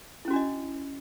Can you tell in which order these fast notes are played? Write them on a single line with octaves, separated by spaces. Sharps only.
E4 C#4 F#4 D4 D#5